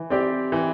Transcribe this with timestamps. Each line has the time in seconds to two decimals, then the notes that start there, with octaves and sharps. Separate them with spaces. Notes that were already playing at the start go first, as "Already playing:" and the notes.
Already playing: E3
0.10 C4 G4 D5
0.52 E3